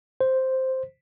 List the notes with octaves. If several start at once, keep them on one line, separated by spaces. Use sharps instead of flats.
C5